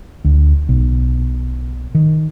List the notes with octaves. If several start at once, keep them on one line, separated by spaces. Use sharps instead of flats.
D2
B1
D#3